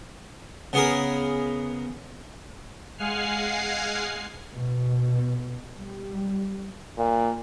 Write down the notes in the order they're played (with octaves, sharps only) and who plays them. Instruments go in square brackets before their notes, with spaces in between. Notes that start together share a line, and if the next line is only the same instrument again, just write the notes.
[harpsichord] C#3 B3 G#4 A#4
[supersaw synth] G#3 F5 F#5 G#5 F6 C7
[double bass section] B2
G3
[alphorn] A#2